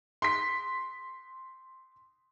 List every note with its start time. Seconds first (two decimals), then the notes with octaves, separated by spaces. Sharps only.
0.22 C6 B6